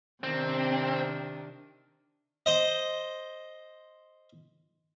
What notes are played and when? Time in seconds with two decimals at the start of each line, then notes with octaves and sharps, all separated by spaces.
0.24 C3 D#3 C4 D4
2.46 C5 D#5